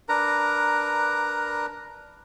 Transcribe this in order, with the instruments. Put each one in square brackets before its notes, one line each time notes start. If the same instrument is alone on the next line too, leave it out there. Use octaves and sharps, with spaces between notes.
[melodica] D4 A#4 B4 A#5